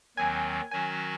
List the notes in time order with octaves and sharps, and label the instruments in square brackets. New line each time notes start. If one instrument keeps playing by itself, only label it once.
[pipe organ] D#2 D#3 F#3 C4 [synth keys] G#5
[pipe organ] D#3 F#3 C#4 F#4 [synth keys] G#5